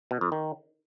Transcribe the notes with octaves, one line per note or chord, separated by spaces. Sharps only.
B2
F2
D#3